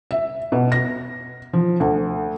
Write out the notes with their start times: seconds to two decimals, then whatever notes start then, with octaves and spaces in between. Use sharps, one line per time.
0.11 E5
0.52 B2
0.72 A#6
1.53 F3
1.80 D2